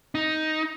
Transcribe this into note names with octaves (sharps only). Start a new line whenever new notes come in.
D#4